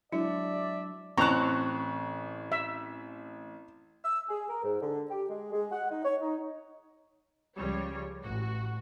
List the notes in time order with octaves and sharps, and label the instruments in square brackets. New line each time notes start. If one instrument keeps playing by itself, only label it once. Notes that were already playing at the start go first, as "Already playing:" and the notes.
[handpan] F#3 G#3 D4 [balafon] E4 [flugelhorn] D5 [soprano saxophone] E5
[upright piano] A1 [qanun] C4 A5 [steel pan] A#5 [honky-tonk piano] C#6 F#6
[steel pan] E5
[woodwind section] E6
G#4
A#4
G#2
D3
G4
G#3
G#3
F#5
D#4
C#5
D#4
[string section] C#2 C#3 F3 G3 C#5
A1 F#4